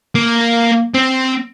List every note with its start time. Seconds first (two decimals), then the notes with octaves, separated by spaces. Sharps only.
0.15 A#3
0.94 C4